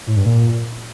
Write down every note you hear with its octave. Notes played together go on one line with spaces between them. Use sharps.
A2
G2
A#2